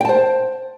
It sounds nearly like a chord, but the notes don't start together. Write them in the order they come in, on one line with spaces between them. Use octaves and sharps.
G5 A5 C5